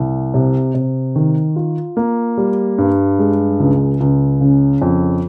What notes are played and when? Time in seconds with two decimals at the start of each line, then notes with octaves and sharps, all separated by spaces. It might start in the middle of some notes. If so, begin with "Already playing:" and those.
Already playing: C2
0.34 C3
0.75 C3
1.16 D#3
1.56 F4
1.97 A#3
2.37 G3
2.78 G2
3.19 G#3
3.60 C#2
4.00 C#2
4.41 C#3
4.82 F2